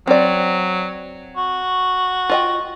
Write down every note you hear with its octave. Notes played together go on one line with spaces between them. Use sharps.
F#3 C4 D5
F#4
F4 D#5 G5